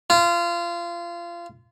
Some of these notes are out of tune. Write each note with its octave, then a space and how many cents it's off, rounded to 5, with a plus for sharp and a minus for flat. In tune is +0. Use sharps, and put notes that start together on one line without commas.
F4 -25